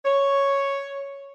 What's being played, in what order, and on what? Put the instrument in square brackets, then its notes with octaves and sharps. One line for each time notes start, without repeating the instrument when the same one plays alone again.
[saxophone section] C#5